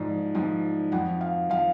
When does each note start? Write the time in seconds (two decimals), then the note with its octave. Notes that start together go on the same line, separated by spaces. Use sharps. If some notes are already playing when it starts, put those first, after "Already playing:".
Already playing: G#2 F3 D5
0.35 G#2 F3
0.92 F2 F3 F#5
1.21 F5
1.49 F3 F5